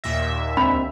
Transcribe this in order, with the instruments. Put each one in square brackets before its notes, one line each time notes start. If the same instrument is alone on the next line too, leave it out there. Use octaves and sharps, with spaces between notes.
[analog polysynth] D#2 A#2 E5 [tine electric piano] A#6
[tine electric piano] C#2 C4 D4 [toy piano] B5